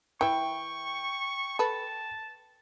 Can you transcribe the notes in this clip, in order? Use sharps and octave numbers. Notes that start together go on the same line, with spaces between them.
E3 E4 G5 C#6
A4 B4 A5